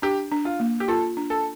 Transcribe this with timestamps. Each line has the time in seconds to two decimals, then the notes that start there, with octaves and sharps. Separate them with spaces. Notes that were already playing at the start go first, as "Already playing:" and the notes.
0.02 D4 G4
0.32 D4
0.45 F4
0.60 A#3
0.80 G4
0.88 F4 A4
1.17 D4
1.30 A4